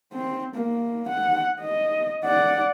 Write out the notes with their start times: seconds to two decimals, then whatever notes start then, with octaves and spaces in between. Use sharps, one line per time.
0.13 C4
0.55 A#3
1.09 F#5
1.61 D#5
2.24 D5 F#5